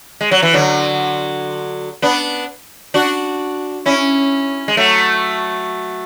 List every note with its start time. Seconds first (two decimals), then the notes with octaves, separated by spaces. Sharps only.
0.21 G#3
0.31 F#3
0.42 E3
0.53 D3 F#3
2.02 B3 D4
2.94 D4 F#4
3.86 C#4 E4
4.68 G#3
4.77 F#3 A3